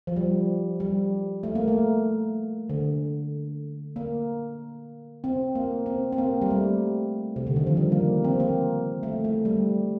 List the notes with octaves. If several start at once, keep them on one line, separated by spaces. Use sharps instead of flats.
F3
G3
G3
A3
A#3
A3
D3
A#3
C4
A#3
C4
C4
A#3
G3
A3
C3
D3
D#3
F3
G3
A#3
C4
A#3
A3
A3
G3